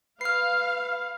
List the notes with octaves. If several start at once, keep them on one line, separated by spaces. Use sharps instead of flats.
B4 F5 F6 C7